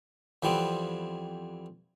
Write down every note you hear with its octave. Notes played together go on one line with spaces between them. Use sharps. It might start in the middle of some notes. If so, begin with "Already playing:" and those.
F2 E3 G3 B3 C4